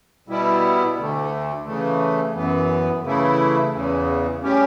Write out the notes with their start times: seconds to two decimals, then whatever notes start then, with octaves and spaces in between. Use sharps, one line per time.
0.28 B2 G3 B3 E4
0.97 D2 D3 A3
1.65 C#3 E3 A3
2.34 F#2 E3 B3
3.03 C#3 E3 A3 E4
3.72 E2 C#3 E3
4.41 A2 G3 C#4 G4